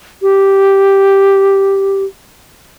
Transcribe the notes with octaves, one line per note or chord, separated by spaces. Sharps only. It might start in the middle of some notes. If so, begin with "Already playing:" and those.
G4